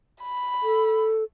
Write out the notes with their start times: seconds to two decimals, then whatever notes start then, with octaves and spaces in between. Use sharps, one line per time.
0.22 B5
0.63 A4